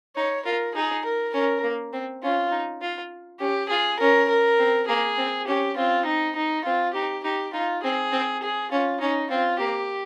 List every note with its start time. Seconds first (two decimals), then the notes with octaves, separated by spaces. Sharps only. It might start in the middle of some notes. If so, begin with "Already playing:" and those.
0.17 D#4 C#5
0.46 F4 A#4
0.75 D#4 G#4
1.05 A#4
1.34 C#4 A#4
1.63 A#3
1.93 C4
2.23 C#4 F4
2.52 D#4
2.82 F4
3.40 C#4 G4
3.70 F4 G#4
4.00 C#4 A#4
4.29 A#4
4.59 C4
4.88 A#3 G#4
5.18 C4
5.48 C#4 G4
5.76 C4 F4
6.06 D#4
6.36 D#4
6.65 C4 F4
6.94 D#4 G4
7.24 D#4 G4
7.54 D#4 F4
7.83 C4 G#4
8.12 C4
8.43 G#4
8.72 C#4 F4
9.01 C#4 D#4
9.30 C4 F4
9.60 A#3 G4